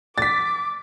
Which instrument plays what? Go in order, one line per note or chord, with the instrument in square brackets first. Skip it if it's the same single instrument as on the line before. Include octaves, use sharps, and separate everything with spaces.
[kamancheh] D6 [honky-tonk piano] A6 B6